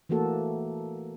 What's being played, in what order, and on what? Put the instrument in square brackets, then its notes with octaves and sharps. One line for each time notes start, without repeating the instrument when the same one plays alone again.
[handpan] E3 A3 A#3 F#4 A4